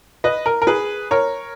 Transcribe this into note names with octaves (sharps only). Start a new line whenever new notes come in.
B4 D#5
A#4
A#4
G#4 B4
A#4 C#5